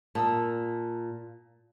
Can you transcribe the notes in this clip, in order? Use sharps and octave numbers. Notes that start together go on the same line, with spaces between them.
A#2 A5 D#6 E6